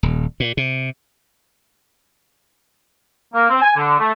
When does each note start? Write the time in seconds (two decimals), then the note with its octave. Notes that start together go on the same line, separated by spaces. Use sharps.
0.03 D#1
0.40 A#2
0.57 C3
3.34 A#3
3.50 C4
3.62 G#5
3.76 D3
3.99 A3